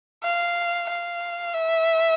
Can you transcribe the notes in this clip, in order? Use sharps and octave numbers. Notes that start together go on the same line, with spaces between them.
F5
F5
E5